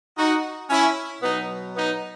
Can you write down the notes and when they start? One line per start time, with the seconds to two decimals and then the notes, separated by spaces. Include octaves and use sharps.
0.18 D#4 F#4
0.70 C#4 E4
1.22 B2 F#3 B3 D#4
1.75 B3 D#4